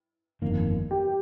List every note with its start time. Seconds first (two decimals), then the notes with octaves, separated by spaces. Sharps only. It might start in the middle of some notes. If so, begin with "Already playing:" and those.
0.42 G1 F2 D#3 A#3
0.91 G4